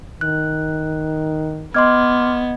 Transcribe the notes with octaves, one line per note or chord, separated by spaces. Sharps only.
D#3 F#6
B3 D#5 C6 D6 F6 G#6